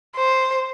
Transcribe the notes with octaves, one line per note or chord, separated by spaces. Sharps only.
C5